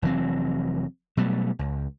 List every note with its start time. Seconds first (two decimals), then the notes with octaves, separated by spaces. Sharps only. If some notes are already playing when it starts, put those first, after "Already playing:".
0.02 F1 E3 F#3 C4
1.17 B2 F#3 G3 A3
1.59 C#2